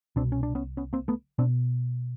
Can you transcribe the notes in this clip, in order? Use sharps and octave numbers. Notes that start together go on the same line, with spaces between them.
C2 B2 C4 D4
C#4
D4
B3 C#4
B3 C#4
A#3 C4
A3 B3
B2 C4 D4